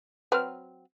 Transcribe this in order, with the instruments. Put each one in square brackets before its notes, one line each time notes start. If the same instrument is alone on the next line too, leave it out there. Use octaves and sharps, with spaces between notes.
[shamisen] F#3 C4 [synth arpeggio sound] B4 F6